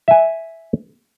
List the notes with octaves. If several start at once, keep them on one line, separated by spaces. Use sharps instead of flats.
E5 G#5